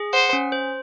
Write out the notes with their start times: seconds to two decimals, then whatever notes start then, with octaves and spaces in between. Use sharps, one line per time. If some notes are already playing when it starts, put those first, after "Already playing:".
Already playing: G#4
0.13 C5 F#5
0.33 C#4
0.52 C5